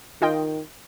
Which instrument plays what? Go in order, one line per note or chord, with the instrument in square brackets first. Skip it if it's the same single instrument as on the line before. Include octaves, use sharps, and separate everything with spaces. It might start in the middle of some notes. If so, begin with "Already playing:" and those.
[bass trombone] D#3 [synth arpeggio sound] F4 D#5 G5